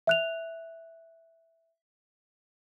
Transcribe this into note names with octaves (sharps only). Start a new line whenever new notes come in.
E5 F#6 F7